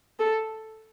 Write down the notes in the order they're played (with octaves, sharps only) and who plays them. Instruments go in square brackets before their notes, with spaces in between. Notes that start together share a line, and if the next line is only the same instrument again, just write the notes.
[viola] A4